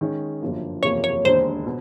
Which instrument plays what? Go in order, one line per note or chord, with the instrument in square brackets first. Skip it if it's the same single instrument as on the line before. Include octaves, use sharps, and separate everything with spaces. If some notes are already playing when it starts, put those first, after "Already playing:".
[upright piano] D#3 G#3 C#4
G1 F#2 D3 F3 A#3
[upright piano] F#1 E2 C3 F3 A#3 [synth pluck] C#5
[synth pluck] C#5
[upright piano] E1 D#2 D3 [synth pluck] C5
[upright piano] B2